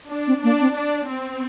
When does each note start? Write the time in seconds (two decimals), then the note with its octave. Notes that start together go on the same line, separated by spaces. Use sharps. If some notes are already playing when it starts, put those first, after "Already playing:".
0.11 D4
0.27 C4
0.44 A#3 D4
0.61 C4
0.78 D4
1.10 C4